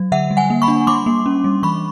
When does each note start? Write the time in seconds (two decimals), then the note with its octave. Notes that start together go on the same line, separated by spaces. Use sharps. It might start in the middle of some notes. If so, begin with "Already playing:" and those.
Already playing: F#3
0.12 D3 E5 F#5
0.31 G3
0.37 F#5 G#5
0.50 A#3
0.62 B5 C#6
0.68 D4
0.87 G3 C6 D6
1.06 A#3
1.26 C#4
1.44 G3
1.63 E3 B5 C#6